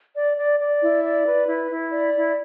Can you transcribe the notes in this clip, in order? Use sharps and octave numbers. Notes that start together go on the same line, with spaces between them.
D5
D5
D5
E4
D5
B4
E4
E4
D5
E4